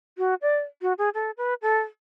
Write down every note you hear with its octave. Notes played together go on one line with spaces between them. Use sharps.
F#4
D5
F#4
G#4
A4
B4
A4